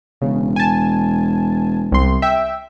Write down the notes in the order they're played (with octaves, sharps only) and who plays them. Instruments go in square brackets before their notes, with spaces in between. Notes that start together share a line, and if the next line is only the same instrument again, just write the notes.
[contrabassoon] E1 [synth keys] C#3
[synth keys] G#5 A5
C2 C6
E5 G5